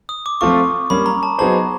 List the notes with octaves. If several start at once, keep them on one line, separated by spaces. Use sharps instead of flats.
D#6
D6
F3 A3 C4 F4 A4 C#6
G3 A#3 C#4 B5
A#5
A5
F#3 B3 D#4 G#4 C5 A5